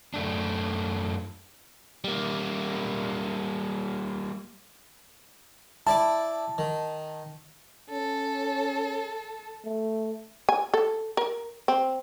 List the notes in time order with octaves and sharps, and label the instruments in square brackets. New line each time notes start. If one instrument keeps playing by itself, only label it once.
[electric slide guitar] F#2 A3 D4
[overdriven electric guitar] G3 A#3
[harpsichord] E4 D5 D6 [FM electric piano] A5
[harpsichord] D#3
[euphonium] C#4 [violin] A4
[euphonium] A3
[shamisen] G#5
A4
A#4
C4